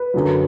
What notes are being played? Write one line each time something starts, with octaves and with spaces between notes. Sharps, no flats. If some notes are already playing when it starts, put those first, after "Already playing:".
Already playing: B4
F#2 D3 F#3